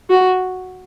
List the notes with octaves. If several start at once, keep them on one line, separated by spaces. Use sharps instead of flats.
F#4